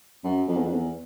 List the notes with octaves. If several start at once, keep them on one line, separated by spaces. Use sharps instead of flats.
F#2
F2
E2
F2
E2